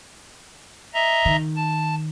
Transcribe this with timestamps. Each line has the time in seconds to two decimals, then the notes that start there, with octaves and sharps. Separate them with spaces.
0.94 D#5 E5 A#5
1.25 D#3
1.56 A5